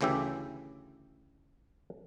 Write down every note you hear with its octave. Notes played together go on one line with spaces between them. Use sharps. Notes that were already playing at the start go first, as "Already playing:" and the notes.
D2 C#3 E3 G4 E5